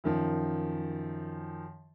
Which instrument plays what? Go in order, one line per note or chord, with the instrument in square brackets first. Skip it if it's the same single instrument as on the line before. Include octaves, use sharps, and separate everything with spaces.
[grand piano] F#2 D#3 F3